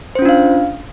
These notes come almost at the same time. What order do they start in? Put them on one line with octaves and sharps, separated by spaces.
C5 C#4 F4 D4 F5